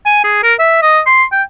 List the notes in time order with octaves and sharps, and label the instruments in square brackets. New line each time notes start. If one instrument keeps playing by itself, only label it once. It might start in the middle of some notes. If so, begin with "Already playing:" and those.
[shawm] G#5
G#4
A#4
E5
D#5
C6
G5